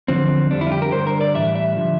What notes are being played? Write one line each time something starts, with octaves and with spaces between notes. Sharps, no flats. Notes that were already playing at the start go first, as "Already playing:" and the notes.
E2 D3 F3 C4
F2 D3 G3 D4
E4
F4
G4
A#4
G2 D3 G3 C5
A#4
D5
A2 E3 G3 E5
E5
D3 F3